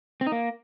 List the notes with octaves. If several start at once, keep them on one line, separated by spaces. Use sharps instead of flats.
C4
D#4
A#3